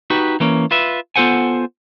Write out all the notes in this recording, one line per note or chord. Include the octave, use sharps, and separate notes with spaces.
D#4 F#4 G4 B4
E3 A#3 C#4
F4 B4 E5
B3 F4 A4 C5 F#5 G#5